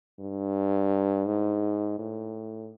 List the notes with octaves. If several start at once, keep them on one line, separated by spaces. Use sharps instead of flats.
G2
G#2
A2